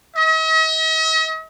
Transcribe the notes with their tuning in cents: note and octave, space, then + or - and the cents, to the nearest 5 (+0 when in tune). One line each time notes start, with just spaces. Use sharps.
D#5 +45